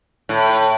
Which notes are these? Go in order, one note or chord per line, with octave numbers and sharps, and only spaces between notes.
A2